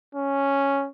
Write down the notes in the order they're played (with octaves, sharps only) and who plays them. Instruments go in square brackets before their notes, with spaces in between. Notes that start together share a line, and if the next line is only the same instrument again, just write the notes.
[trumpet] C#4